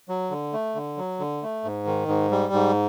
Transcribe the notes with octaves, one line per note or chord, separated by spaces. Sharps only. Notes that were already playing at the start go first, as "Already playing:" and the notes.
F#3
D3
A3
D3
F#3
D3
A3
G#2
D#3
G#2
G3
G#2